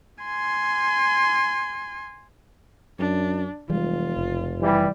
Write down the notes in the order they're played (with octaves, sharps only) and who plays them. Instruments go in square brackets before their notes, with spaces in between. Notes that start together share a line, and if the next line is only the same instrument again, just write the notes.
[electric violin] G#5 C6
[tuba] F#2 [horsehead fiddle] D4
[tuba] F1 [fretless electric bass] E3 G3 G#3 [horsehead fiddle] F4
[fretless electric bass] F#1
[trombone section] E3 G3